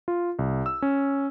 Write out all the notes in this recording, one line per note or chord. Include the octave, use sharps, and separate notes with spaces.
F4
C2
E6
C#4